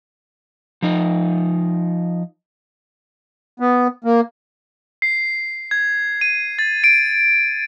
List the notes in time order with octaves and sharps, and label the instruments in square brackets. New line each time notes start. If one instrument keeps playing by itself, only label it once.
[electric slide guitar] F3 D#4
[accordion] B3
A#3
[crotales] C7
G#6
D#7
A6
D7